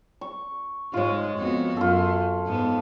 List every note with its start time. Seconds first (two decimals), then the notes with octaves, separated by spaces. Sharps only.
0.21 C#6
0.94 G#2 G#3 F4 C#5
1.38 F2 B3 F#4
1.77 F#2 F4 A4
2.46 G#2 G#3 B3